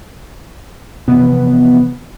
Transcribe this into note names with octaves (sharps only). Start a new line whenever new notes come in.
C3 E3 F3 B3